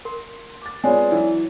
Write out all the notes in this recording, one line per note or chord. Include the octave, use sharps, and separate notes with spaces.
A#4 C6
D6 A6
G#3 B3 F4 C#5 D5 G#5
E3 F#3